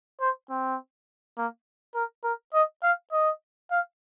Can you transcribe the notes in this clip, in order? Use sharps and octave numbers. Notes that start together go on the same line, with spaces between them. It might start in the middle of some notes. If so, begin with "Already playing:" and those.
C5
C4
A#3
A#4
A#4
D#5
F5
D#5
F5